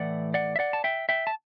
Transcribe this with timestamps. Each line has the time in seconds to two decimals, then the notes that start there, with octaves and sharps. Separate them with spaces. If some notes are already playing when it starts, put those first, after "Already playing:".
Already playing: A2 E3 A3 D5 F#5
0.34 D5 F#5
0.56 E5
0.59 D5 F#5
0.73 A5
0.84 E5 G5
1.09 E5 G5
1.27 A5